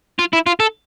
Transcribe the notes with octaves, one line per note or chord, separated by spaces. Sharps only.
F4
E4
F4
A4